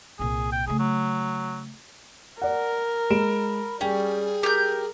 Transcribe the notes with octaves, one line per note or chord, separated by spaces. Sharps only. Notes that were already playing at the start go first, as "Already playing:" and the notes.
C2 A#2 G#4
G5
C#3 A3 G#4
F#3
A#4 D5 F#5
G#3 B5 D7 E7
G3 C#4 G#4 G5
G4 A#4 G6